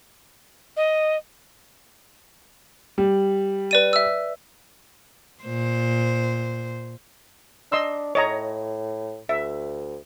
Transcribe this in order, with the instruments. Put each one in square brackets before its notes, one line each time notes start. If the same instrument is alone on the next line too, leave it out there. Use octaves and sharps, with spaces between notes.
[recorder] D#5
[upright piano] G3
[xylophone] B4 D5 D#7
E5 E6
[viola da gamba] A#2 C5
[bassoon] D4 [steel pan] D#5 C6 E6
[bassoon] A2 [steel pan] C#5 D#5 A#5
[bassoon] D2 [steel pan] E5